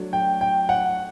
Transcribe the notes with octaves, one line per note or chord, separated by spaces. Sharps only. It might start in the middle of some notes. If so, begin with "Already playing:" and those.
Already playing: F#3 A3 D4
G5
G5
F#5